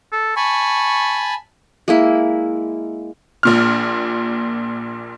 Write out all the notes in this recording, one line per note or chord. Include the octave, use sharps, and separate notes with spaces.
A4
G#5 A5 B5 C#6
G#3 A#3 E4
A#1 A#2 F6